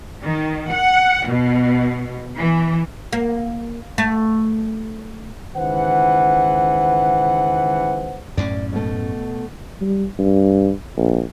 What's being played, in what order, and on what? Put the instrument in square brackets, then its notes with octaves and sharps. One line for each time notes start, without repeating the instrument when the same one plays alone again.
[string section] D#3
F#5
B2
E3
[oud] A#3
A3
[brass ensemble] C#2 D#3 E3 B4 C5 F#5
[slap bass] F#2 A2 C#4 [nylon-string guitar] D5
[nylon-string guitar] B2 A3
[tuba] G3
G2
A#1